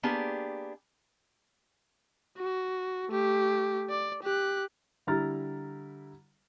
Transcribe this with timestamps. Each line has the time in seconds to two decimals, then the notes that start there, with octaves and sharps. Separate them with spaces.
0.03 A#3 B3 D4 G4 G#4
2.37 F#4
3.10 A3 G4
3.90 D5
4.23 G4 F#6
5.07 D3 G3 E4 A#5 F6 A6